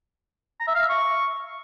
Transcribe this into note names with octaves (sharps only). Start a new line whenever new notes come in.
A#5
E5
F5
E5
C#6